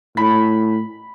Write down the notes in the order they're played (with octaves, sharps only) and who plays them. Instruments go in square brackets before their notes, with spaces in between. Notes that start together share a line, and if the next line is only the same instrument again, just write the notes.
[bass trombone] A2 [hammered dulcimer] B5